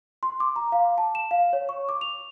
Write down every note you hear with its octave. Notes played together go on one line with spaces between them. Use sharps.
C6
D6
A#5
F5
A5
E7
F5
C#5
C#6
D6
F7